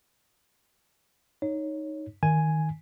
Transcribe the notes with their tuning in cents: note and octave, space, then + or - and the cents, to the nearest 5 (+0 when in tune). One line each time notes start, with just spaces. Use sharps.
D#4 +0 C#5 +0
D#3 +0 G#5 +0